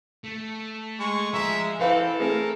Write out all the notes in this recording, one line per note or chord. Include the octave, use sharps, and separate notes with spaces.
A3
G#3 C#6
F3 E5 A#5
E3 C4 A4 B4 C5 F5
A3 C4 G#4 A#4